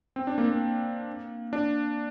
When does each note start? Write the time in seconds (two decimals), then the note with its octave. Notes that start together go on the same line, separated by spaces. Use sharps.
0.16 C4
0.27 D4
0.38 A#3
0.50 A#3
1.53 D4